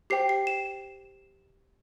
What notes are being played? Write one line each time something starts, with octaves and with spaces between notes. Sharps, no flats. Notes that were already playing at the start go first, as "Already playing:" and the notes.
G4 C5 G5 C7
C7
E7